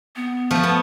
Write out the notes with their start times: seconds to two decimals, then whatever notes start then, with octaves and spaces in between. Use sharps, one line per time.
0.16 B3
0.51 F3 A3
0.63 B3